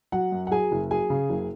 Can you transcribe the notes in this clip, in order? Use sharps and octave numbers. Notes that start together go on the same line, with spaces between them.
F#3 F#5
F#2
F#5
F#3 G#4 G#5
F#1
F#3 G#4 G#5
C#3
F#1